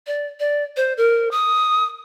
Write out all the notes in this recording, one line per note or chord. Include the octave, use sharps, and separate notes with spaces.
D5
D5
C5
A#4
D#6